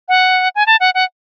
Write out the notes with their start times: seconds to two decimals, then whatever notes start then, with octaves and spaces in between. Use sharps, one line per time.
0.08 F#5
0.55 G#5
0.66 A5
0.80 F#5
0.94 F#5